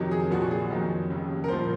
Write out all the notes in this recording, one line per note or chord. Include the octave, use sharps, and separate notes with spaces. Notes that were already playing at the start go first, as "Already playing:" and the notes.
Already playing: F2 C3 D#3 F#3
G#4
A#1 A#2 F3 F#4
F#4
G#4
F2 D#3 F#3
F1 D#2 C#3
A#4
C2 A#2 F3 C5